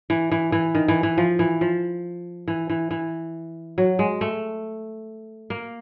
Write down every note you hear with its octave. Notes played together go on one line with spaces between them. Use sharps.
E3
E3
E3
D#3
E3
E3
F3
E3
F3
E3
E3
E3
F#3
G#3
A3
A#3